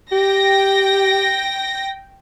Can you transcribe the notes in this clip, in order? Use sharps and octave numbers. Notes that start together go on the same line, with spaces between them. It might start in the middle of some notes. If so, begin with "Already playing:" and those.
G4 G5 A#6